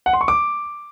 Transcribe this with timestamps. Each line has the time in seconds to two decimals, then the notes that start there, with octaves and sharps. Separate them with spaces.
0.06 F#5
0.13 C6
0.21 C#6
0.28 D6